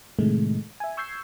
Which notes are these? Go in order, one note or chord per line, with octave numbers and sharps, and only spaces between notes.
A2 C3 D#3 G#3 A3
E5 G#5
C#6 E6 G6 G#6 C7